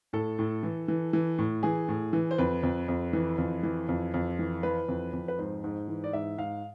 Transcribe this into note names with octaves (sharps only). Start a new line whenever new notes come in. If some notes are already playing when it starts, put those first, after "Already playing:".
A2 A4
A2
E3
E3
E3
A2
E3 G#4
A2
E3
C5
F2 B4
F2
F2
E3
F2
E3
F2
F2
E3
E3 B4
F2
F2
B4
G#2 C5
G#2
E3
D5
G#2 E5
G#2 F5